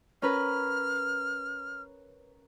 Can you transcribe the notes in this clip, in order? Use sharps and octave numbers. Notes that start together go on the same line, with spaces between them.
C#4 A#4 B4 F6